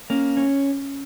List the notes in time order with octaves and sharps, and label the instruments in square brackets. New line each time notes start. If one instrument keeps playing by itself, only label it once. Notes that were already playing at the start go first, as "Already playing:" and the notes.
[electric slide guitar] A#3 [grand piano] C#4
[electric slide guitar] C#4